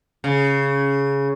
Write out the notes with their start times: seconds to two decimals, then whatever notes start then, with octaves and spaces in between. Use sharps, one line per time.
0.24 C#3